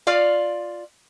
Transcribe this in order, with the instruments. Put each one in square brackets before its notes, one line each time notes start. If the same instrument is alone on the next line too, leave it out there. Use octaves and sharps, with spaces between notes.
[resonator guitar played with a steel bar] F4 D5 F5